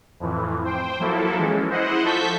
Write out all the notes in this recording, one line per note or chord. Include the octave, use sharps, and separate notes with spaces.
F2 A2 E3
C5 G5
F3 F#3 A#3 E4 A4
E3 G#3 C#4
E4 C5 D#5 F#5
F3 A4 A5 C#6 G6 B6